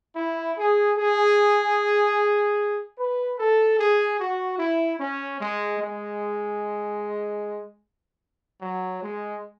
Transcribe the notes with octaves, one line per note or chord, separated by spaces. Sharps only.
E4
G#4
G#4
B4
A4
G#4
F#4
E4
C#4
G#3
G#3
F#3
G#3